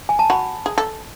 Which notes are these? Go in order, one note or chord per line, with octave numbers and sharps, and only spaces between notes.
G#5
A5
F#4 B5
G#4
A4